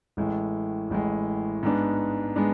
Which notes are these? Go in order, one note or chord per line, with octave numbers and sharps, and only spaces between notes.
A1 A2 G#3
A1 A2 G#3
G#2 G#3 B3 D4
G#3 B3 D4